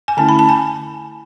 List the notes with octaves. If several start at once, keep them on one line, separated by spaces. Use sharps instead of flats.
G#5
D3 A3 C#4 E4 A5
B5
A5
G#5